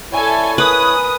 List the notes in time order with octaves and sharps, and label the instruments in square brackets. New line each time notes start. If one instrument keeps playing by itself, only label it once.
[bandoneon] E4 C#5 [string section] A4 G#5 [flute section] D5 E5
[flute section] A#4 G#5 F#6 [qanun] B4 [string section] D#6